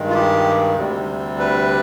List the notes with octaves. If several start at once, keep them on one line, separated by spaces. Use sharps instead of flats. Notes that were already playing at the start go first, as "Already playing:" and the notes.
Already playing: G2 D#3 G#3
F4
G4
D2 C3 G3
B4